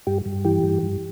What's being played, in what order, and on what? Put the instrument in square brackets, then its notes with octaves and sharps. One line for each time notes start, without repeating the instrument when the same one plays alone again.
[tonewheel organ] G2 G4
G2
E3 G4
G2
G2